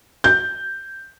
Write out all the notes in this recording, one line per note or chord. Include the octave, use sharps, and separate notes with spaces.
G6